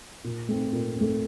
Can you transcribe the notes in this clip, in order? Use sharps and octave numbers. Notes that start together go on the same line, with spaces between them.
A#2
A3 C4
A#2
A3 C4